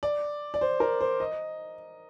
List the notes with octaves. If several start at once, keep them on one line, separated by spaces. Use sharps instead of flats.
D5
D5
C5
A#4
C5
D#5